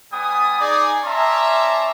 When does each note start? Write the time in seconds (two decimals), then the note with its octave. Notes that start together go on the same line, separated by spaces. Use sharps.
0.12 G3 B3 G#5 D#6
0.60 D#4 G#4 D5
1.05 C#4 D5 E5 A5 A#5 C6